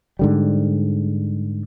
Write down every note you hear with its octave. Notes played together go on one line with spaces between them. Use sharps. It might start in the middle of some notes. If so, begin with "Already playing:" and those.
G#2 D3 G3